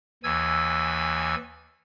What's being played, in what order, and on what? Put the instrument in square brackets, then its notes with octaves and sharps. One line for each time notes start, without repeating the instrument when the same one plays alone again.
[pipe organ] D#2 E3 G#5 E6 G#6